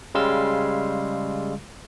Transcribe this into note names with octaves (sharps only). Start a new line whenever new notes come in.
C#3 G3 G#3 F5 C6 E6